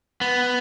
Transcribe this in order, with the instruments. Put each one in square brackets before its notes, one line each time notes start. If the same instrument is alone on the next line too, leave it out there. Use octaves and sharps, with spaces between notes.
[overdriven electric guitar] B3